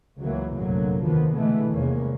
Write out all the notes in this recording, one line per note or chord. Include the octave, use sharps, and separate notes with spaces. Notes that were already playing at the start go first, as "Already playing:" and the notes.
C#2 C#3 E3 F#3 A#3
F1 A#1 F#2 D3 F#3 A#3
D#2 D3 D#3 F3 B3
B2 D3 E3 G#3 A3 B3
E2 C3 D#3 G#3 A#3 C#4